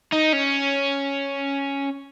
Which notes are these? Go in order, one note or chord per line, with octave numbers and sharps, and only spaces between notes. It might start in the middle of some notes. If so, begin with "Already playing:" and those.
D#4
C#4